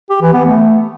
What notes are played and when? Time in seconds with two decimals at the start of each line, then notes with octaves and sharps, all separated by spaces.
0.10 G4
0.22 E3
0.33 B3
0.45 A3